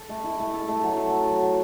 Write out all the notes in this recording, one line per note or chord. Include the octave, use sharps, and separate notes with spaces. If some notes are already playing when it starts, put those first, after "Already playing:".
Already playing: A4
A3
E4
A3
A4
A3
F#3
A4
F#3
F#3
F#3